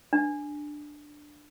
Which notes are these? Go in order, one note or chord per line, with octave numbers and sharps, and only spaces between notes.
D4